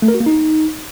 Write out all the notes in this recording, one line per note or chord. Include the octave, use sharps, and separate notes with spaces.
A3
A#4
F#4
A#3
D#4